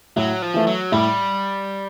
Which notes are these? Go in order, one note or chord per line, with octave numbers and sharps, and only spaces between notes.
A2 F#3
F3
E3 A3
F#3
A2 G3